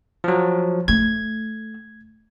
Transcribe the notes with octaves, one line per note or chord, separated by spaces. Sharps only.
F3 F#3
A3 G#6